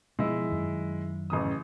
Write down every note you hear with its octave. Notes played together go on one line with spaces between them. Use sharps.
B2 F3 G#3 E4
F#2 D#3
A1 C#3 D#6